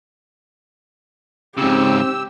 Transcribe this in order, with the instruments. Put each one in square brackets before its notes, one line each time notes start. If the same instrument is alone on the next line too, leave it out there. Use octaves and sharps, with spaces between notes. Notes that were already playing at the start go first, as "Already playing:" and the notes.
[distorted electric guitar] G#2 C#3 [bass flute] C4 [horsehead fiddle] G4 [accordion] E6